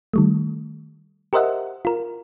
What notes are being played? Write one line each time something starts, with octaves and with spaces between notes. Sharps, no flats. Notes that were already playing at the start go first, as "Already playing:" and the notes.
D#3 G3 A3
G4 A#4 C5 D#5 E5 F#5
F4 A#4